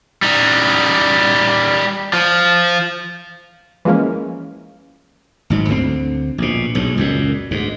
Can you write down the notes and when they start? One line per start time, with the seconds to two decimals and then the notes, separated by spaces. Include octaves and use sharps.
0.22 G3 D#4
2.13 F3
3.85 E3 F3 G#3 A#3 C#4
5.50 G#1 G#2 F#3
5.69 D2 D3 E3 C4
6.38 A#1 B2
6.75 B1 G#2
6.98 C#2 F#2 A#2
7.51 D2 G#2